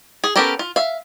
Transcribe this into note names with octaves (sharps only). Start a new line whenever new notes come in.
G#4
B3 C#4 G4 A4 A#4
F4
E5 F5